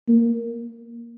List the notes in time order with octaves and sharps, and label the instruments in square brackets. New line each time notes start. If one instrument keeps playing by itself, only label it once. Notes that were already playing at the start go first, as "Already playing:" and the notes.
[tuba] A#3